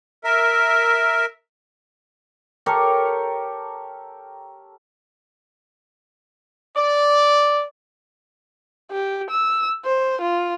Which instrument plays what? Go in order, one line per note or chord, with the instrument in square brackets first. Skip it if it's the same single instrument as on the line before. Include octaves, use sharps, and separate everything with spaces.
[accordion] A#4 E5
[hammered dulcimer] G4 A4 A#4 C#5
[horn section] D5
[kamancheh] G4
E6
C5
F4